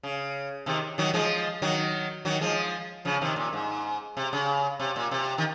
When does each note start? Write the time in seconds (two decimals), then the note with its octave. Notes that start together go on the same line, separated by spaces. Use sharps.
0.03 C#3
0.66 C3 D#3
0.98 D#3 F#3
1.14 F3 G#3
1.62 D#3 F#3
2.25 D#3 F#3
2.41 F3 G#3
3.05 C#3 F3
3.21 C3 D#3
3.36 A#2
3.53 G#2
4.17 C3
4.33 C#3
4.79 C3
4.96 A#2
5.11 C3
5.38 D#3